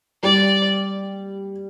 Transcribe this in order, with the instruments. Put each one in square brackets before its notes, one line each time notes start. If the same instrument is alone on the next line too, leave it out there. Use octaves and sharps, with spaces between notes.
[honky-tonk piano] G3 [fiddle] D5